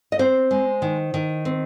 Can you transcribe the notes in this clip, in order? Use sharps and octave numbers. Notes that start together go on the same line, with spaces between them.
D#5
C4 C5
G#3
D#3
D#3
C4